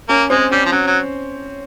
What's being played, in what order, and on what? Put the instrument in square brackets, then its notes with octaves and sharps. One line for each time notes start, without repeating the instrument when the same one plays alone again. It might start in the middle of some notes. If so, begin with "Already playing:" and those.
[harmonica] A#3 [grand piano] C#4
[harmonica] G#3 [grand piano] C4
[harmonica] G3 [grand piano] C#4
[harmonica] F3
[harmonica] F#3 [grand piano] C#4
[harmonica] F#3